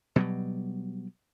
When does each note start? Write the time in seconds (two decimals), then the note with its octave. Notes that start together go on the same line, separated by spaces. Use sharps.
0.16 B2 F#3 G3